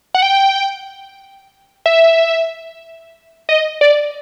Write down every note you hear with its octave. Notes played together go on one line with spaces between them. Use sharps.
F#5
G5
E5
D#5
D5